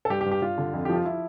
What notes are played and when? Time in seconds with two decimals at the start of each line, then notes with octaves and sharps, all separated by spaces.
0.05 A4
0.10 G2 G4
0.21 G4
0.26 G2
0.32 G4
0.42 G2 F4
0.58 D3
0.74 F2
0.85 F3 G4
0.95 F4
1.05 F3 E4